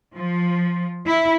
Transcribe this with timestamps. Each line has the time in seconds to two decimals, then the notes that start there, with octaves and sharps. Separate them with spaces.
0.16 F3
1.07 E4